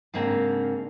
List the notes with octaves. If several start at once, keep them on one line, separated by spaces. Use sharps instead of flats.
G#2 C#3 A#3 C4 D4